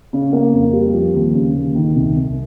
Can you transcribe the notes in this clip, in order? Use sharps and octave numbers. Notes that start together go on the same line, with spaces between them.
C#3
A#3
F2
G3
F3
D#2
C#3
D#2
D#3
C2
C2